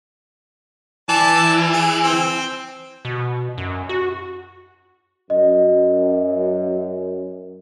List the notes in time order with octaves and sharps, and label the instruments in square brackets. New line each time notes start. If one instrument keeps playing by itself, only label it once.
[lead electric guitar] E3 [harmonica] D5 A5
[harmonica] G#4
C4
[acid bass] B2
F#2
F#4
[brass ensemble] F#2 [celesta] D#5